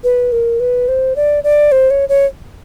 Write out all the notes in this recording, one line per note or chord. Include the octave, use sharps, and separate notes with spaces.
B4
A#4
B4
C5
D5
D5
C5
C#5
C#5